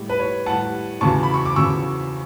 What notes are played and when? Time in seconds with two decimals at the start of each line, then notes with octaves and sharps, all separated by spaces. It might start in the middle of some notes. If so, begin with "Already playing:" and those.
Already playing: A2 G3
0.09 B4
0.19 C#5
0.46 A2 G3 F#5 A5
1.01 E2 C#3 F#3 A5 C#6
1.23 B5
1.34 C#6
1.45 D6
1.56 E2 C#3 F#3 C#6 E6